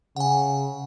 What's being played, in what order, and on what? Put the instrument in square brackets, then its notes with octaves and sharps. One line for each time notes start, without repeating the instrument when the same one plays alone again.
[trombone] C#3 [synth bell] F#5 G#5